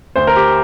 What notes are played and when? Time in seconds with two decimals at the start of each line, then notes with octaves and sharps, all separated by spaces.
0.16 D2 C5
0.27 A#4
0.36 G4